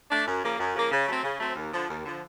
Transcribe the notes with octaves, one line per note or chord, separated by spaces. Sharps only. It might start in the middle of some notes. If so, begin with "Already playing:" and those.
A3 D4
F#2
C#3 F3 A#3
F#2
C#3 F3 A#3
C#3
F#3 A3 C4
C#3
F#3 A3 C4
D#2
D3 F3
D#2
D3 F3